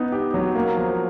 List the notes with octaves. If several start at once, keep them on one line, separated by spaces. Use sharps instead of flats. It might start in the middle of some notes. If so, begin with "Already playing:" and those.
Already playing: B3 D#4
G4
F#3
A#3
F3